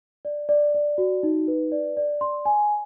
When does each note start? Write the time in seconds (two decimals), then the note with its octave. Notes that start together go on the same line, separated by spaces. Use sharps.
0.25 D5
0.49 D5
0.75 D5
0.98 F#4
1.23 D#4
1.48 B4
1.72 D5
1.97 D5
2.21 C6
2.46 G#5